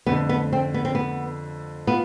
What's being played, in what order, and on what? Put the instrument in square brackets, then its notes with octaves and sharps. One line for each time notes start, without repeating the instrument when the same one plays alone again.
[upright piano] F2 D3 A3 [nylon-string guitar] B3
[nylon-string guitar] B3
C4
B3
C4
B3
[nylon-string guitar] B3 [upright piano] F4